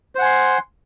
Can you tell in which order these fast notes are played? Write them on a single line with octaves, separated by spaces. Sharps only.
C5 F#5 G#5 C6